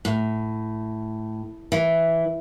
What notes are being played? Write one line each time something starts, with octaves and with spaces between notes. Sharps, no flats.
A2
E3